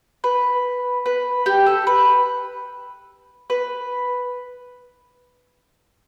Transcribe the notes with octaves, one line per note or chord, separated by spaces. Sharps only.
B4
B4
G4
A4
B4
B4